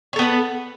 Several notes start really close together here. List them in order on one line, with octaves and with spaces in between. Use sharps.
C#5 A4 B3 B4